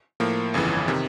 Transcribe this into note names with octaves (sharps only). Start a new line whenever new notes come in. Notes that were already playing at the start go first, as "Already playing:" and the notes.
A2 F3 A#3
G1 F2 C#3 E3
C3 D#3